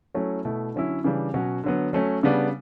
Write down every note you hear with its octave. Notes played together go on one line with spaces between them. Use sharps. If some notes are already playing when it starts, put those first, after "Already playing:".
F#3 A3 C#4 E4
B2 A3 E4
D3 F#3 C#4 E4
C#3 E3 G3 D4
B2 F#3 C#4 F#4
D3 F#3 B3
F#3 A3 C#4
C#3 G3 B3 D4